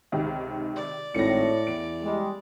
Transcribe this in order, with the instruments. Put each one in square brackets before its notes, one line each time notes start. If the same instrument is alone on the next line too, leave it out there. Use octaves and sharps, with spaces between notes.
[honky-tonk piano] C#2 C3 D#3
[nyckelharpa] D5
[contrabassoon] G#1 [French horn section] A2 [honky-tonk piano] A#6 C#7
[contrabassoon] E2 [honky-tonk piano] D7
[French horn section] G3 G#3